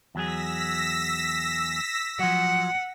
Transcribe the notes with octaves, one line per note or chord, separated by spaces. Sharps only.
E2 F#3 G#4 E6 A#6 B6
F3 F#3 F#5